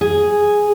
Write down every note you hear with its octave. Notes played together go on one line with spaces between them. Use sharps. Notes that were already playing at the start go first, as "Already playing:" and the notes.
G#4